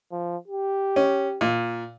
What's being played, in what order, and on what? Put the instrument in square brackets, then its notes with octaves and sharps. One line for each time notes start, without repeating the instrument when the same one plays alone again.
[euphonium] F3
G4
[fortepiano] C#4
A#2